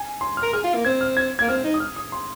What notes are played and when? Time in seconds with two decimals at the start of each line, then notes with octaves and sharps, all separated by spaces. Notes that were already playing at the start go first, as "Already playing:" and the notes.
Already playing: G#5
0.21 C6
0.37 F6
0.42 A#4
0.53 G#4 F6
0.64 F4
0.75 A#3
0.85 C4 G#6
1.01 F6
1.17 G#6
1.39 A#3 G#6
1.49 C4 F6
1.64 D#4
1.74 D#6
1.80 F6
1.96 D#6
2.12 C6